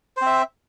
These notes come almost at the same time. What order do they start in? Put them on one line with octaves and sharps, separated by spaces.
C5 C4 E5